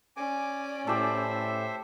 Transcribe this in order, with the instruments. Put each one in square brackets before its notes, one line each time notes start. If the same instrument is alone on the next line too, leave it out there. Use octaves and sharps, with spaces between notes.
[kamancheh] C#4 D5 [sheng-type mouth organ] G#5 D6
[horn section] A2 [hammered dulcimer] G4 A4 [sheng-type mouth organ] C5 E5